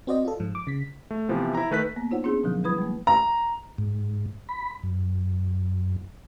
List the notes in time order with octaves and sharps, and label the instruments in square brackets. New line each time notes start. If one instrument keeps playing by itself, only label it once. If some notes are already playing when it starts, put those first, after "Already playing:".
[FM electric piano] C4 F#4 C5 D5 D#5
F4 A4
G#2 F3
D6
C#3 B6
[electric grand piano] A3
C3 E3 F3 B3
E4 A#5
D#3 A3 B4 F#6 B6
[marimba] A#3 B3
D#4 F4 C5 C#5 F#5
B3 C#4 D4 F4 G#4
B2 D3 F3 F#3
G3 E4 B4 B5 D#6 G#6
G#3 A#3
[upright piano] A#5
[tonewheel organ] G#2
B5
F#2